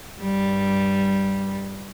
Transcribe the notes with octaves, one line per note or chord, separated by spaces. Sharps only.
G2 G3